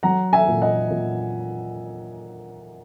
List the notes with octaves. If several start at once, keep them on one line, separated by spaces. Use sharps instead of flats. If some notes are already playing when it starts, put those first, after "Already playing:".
F#3 F#5 A#5
E5 G#5
A#2
D#5 F#5
A#2